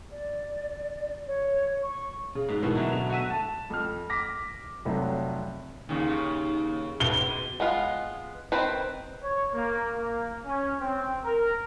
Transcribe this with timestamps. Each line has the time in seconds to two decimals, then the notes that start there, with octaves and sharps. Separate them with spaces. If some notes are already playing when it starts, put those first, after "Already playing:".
0.11 D5
1.27 C#5
1.82 C#6
2.35 C#3
2.49 G#2 B2 G#3
2.63 B2 D#3 E3 A3 B3
2.75 D3 F#3
2.92 B2 F7
3.10 F#4 E5 F#5 D#7
3.30 A5
3.70 F2 F6
4.10 D6 A#6 B6
4.85 F1 C3 F#3
5.89 D#2 C#3
7.00 B2 G7
7.60 G#3 B3 F4
8.52 D#3 C4 B4 C5
9.23 C#5
9.53 A#3
9.92 A#3
10.46 C#4
10.81 C4
11.24 A#4